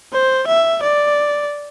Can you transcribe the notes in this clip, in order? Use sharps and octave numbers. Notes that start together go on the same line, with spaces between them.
C5
E5
D5